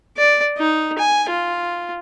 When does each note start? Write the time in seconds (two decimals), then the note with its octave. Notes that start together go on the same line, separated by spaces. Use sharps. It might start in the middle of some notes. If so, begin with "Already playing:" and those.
0.17 D5
0.58 D#4
0.98 G#5
1.30 F4